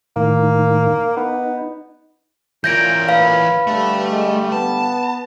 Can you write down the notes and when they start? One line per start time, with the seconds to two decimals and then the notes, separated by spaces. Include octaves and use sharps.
0.16 A2 D#3 A#3
1.17 B3 D#4
2.64 A#2 E3 C#5 G6 A#6 D7
3.09 B4 F5
3.67 D3 G3 A3
4.11 G#3
4.52 B3 A5